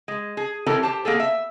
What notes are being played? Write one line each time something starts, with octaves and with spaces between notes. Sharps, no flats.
G#3
G#4
E3 C4 C#4 G4 A4 A#4
G4 C5 A5
A#3 B3 G#4 A4
E5